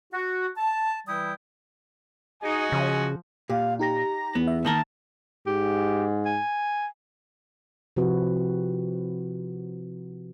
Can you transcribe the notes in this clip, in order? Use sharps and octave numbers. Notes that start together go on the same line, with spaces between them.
F#4
A5
E3 G3 E4 G5 D#6
D#4 F#4 G#4 D#5 G#5
C#3 F3
A#2 G4 F5
D#4 G4 A#5 A#6
E2 B3
E5
D#3 A#3 A#4 A5
G#2 G4
G#5
C3 F3 C4 E4 F#4 B4